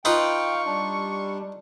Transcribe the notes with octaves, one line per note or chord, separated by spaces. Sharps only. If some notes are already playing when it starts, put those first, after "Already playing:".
D#4 F4 B4 F5 G5 C#6
G3 D4